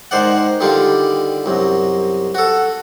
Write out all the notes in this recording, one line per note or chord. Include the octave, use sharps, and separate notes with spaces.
G#2 D#3 C5 D5 F#5
D3 D#3 G3 F4 G4
C2 F#2
F#4 A4